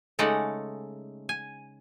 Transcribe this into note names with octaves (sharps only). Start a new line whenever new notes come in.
C#3 G#3 A3 D#4 D5 F#5
G#5